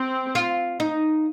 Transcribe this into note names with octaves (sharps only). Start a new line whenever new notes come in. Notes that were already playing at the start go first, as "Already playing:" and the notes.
Already playing: C4
F4
D#4